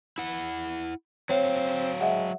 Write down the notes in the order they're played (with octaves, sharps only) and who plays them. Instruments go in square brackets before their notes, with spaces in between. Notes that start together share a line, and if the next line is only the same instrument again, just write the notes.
[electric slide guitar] E4 F#5
[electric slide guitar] F#3 F5 [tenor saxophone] C4 [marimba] C#5
[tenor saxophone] G#3 [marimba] E5 F#5